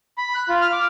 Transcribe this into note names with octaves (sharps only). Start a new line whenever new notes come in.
B5
F#6
F4
F6
D6